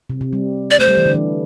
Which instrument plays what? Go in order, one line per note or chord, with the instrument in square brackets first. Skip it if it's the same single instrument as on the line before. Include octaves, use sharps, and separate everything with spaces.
[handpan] C3
C3
G3
[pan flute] D5
[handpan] A3 [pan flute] C5
[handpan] G3
E3
D3
E3